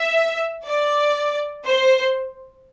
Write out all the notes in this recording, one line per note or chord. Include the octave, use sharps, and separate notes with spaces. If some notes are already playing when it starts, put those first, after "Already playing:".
Already playing: E5
D5
C5